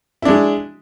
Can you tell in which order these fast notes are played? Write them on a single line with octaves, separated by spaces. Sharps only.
E4 D4 G#3